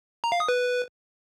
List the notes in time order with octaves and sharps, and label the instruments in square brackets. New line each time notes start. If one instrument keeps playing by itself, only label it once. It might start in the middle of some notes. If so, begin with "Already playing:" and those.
[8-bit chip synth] A#5
F5
D#6
B4